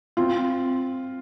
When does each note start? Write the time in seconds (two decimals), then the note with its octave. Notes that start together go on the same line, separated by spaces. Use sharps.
0.17 C4 F4